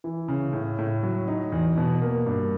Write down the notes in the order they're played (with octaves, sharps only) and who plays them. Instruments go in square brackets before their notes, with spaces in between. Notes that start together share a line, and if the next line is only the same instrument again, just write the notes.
[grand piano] E3
C#3
A2
A2
F#3
D#4
E2
B2
A#3
G2